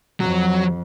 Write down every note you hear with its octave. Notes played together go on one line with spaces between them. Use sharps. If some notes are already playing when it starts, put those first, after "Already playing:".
F2 F#3